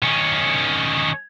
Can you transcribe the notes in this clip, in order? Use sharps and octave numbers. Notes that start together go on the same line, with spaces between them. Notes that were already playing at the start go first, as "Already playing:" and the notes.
D#3 C#4